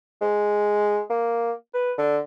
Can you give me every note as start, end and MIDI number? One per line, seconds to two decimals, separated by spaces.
0.21 1.01 56
1.10 1.52 58
1.74 1.92 71
1.98 2.18 50